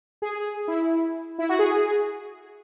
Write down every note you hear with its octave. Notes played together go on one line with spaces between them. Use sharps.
G#4
E4
E4
F#4
G#4